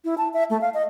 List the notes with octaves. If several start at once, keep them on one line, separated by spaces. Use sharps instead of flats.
E4
A5
E5
A3
F5
D#5